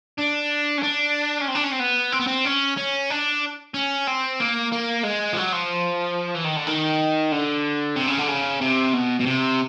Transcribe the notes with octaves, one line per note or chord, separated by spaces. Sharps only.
D4
C#4
D4
C#4
C4
D4
C#4
C4
B3
C4
B3
C4
C#4
C#4
D4
C#4
C4
A#3
A#3
G#3
F3
F#3
F3
E3
D#3
D3
D#3
D3
C3
C#3
D3
C#3
C3
B2
B2
C3